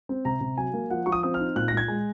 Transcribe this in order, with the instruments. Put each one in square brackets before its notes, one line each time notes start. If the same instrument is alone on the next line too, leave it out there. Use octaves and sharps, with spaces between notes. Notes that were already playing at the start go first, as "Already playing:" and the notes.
[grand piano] C4
C3 A#5
C3
F#3 G#5
A#3
F3 F#5
F3 C#6
D#6
C4 D#6
F6
D#4
A#2 F#6
A#6
A#2 G#6
G#3